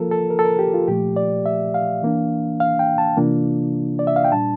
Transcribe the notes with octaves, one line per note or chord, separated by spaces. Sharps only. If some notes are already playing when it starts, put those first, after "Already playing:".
Already playing: F3 A#3 F4 A4 A#4
A4
A#4
A4
A#4
G4
F4
A#2 F3 A3 G4
D5
E5
F5
E3 A#3 D4
F5
G5
A5
C3 E3 A#3 D4 F4
D5
E5
F5
G5
A#2 G3 D4 A5